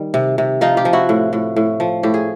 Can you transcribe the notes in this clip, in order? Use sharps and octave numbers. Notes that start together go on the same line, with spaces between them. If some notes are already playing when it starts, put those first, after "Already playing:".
Already playing: D#3 G3
C3
C3
F3 D#4 F4
F4 G4
F3
E4 F#4
A2
A2
A2
F3
A2 G4
G#4